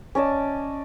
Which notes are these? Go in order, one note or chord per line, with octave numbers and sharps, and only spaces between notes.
C#4 D5 D#5 A5